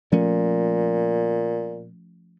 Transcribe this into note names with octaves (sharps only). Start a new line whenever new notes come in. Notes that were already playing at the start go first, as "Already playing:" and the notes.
A#2 F3 A3 C#4